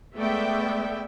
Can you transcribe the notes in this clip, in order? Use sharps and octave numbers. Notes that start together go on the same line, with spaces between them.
G#3 A3 B3 D5 E5 G5